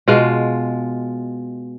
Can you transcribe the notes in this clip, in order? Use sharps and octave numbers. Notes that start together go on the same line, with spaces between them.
B2 G#3 F4